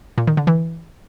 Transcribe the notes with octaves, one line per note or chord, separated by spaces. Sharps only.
A#2
D#3
D3
E3